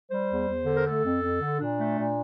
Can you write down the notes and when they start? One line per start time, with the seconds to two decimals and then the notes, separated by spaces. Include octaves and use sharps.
0.09 G3 C5
0.29 E2
0.46 E2
0.65 D3
0.77 A#4
0.84 A3 A4
1.04 F2
1.22 F2
1.40 D3
1.59 A#2 D4
1.79 A3
1.98 A#2